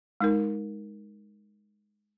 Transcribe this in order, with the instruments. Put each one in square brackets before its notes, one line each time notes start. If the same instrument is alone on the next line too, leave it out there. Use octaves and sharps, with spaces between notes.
[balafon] G#3 D#4 A#4